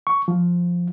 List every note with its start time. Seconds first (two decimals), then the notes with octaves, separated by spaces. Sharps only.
0.07 C#6
0.28 F3